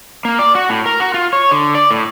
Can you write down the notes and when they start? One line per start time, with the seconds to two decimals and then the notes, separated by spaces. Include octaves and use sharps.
0.25 A#3
0.39 D5
0.55 F#4
0.69 A2
0.86 A#4
1.00 F#4
1.14 F4
1.33 C#5
1.51 D3
1.75 D5
1.91 A2